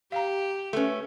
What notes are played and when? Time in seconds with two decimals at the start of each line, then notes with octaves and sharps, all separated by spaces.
0.12 G4 F5 A#5
0.73 A3 C#4 A4 B4